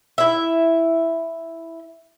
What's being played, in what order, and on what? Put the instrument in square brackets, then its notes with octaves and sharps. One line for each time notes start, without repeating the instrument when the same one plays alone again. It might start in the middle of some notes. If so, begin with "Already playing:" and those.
[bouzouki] E4 E5